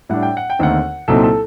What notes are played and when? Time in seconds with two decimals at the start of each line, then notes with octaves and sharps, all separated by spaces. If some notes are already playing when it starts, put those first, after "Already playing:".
0.09 A2 G3 D4 F#5
0.23 G5
0.37 F#5
0.50 G5
0.59 D#2 D3 A3 C4 D#4 F#5
1.08 C2 A#2 F#3 C4 D#4 A4
1.24 A4